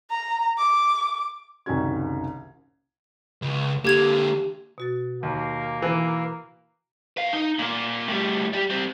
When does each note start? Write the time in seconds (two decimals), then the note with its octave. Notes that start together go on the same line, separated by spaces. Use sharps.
0.10 A#5
0.58 D6
1.66 F#1 C2 D#3 C#4 F#4 G#6
3.42 C#2
3.85 D3 A#3 G4 G#6 F7
4.78 B2 F#4 A6
5.23 D#2 A#3
5.82 E3
7.17 B4 F5
7.33 D#4
7.59 A#2 A#3
8.08 A2 G3
8.53 G3 G4
8.70 G3 C4